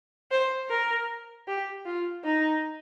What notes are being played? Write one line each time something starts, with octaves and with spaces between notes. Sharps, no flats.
C5
A#4
G4
F4
D#4